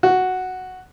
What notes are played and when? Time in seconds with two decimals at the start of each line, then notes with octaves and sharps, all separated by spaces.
0.03 F#4